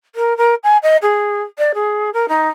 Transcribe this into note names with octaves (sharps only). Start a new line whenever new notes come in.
A#4
A#4
G#5
D#5
G#4
D5
G#4
A#4
D#4